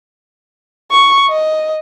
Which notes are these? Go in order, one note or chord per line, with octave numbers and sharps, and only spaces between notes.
C#6
D#5